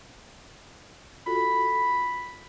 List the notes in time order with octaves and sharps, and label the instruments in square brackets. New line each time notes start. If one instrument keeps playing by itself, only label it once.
[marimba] F4 F#4 A4 [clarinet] B5